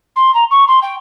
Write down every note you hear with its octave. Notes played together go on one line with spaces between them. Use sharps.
C6
A#5
C#6
C6
G5